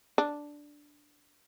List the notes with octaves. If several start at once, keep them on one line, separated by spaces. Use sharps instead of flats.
D4